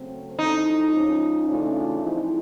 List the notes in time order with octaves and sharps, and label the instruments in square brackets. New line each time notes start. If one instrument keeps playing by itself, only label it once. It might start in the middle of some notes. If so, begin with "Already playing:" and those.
Already playing: [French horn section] C#3 F#3 A3 C4
[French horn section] F3 G#3 C4 E4 A4 [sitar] D#4
[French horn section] F3 G#3 C#4
C#3 E3 A3 D4 F4
F3 G#3 C4 E4